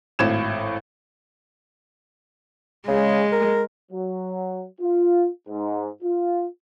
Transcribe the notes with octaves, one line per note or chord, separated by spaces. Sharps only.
G#1 A2 G#6 E7
C#3 G#3
A#4
F#3
F4
G#2
F4